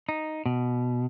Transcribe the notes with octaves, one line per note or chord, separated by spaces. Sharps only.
D#4
B2